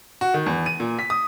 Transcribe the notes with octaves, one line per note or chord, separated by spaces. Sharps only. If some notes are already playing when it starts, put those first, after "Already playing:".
F#4
D#3
E2
D#7
A#2
B6
D#6